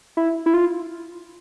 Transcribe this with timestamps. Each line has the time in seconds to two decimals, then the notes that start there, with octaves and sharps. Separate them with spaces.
0.17 E4
0.46 E4
0.54 F4